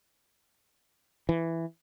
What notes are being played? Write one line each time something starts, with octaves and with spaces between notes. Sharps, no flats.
E3